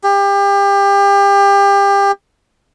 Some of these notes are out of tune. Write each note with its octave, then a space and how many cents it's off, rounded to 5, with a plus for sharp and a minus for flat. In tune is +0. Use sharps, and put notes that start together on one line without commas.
G4 +30